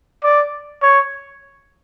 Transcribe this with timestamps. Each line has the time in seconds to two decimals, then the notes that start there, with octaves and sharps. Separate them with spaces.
0.24 D5
0.82 C#5